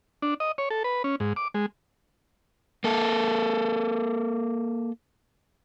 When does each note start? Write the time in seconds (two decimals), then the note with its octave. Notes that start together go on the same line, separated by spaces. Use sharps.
0.22 D4
0.40 D#5
0.58 C#5
0.71 A4
0.84 B4
1.04 C#4
1.20 G#2
1.36 D6
1.54 G#3
2.84 A#3 A4